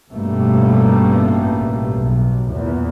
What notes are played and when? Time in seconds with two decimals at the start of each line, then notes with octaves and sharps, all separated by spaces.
0.11 A1 G2 B2 G3 A3 A#3
1.95 B1
2.51 E2 A#2